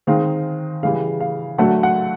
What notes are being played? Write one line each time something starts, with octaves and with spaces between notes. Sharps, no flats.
D#3 G#3 C4 D#4 F5
C#3 E3 G3 F5
F5
D3 F#3 A3 F#5
F#5